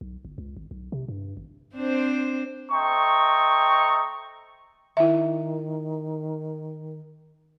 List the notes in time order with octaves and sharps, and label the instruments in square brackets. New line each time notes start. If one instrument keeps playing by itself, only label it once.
[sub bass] B1
G1
C#2
G#1
B1
C3
G2
G#1
[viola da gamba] C4 D4 C5
[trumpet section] A3 C5 D#5 G5 A#5 C#6
[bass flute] D#3 [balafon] E4 E5